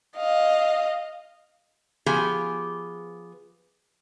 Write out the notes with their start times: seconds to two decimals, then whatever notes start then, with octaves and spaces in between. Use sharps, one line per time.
0.16 D#5 F5
2.06 F3 B3 G4 G#4